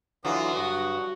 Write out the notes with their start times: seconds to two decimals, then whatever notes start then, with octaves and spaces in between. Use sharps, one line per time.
0.25 D3 E3 F#3 F4 D#6
0.56 G2 F#4